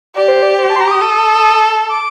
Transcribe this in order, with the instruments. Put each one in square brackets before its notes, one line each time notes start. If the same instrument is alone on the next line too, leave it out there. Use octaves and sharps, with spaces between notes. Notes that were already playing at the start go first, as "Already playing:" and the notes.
[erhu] G4 [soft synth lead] D5
[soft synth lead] C5
D5
C5
A5
C6
A#5
D6
D#6
[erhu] A4
[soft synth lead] D6